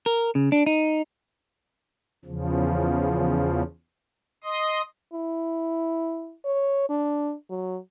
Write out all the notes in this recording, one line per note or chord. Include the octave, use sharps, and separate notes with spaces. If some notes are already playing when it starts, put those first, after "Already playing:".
A#4
C#3
D4
D#4
E2 C#3 F3
D#5 C6 D#6
E4
C#5
D4
F#3